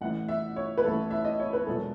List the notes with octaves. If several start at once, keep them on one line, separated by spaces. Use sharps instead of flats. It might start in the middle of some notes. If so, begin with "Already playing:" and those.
A1 A2 E3 F#5
E5
C#5
B4
A1 A2 E3 A4
E5
D#5
C#5
B4
E1 E2 B2 F#3 A4